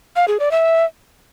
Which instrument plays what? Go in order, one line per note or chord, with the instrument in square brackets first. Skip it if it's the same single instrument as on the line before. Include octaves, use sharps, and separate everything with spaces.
[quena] F5
G#4
D5
E5